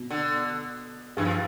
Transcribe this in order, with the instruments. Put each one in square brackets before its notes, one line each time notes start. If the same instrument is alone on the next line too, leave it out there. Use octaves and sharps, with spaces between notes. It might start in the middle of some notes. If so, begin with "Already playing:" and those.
Already playing: [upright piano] B2
[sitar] D3
[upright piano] G2 [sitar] E3
[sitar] F3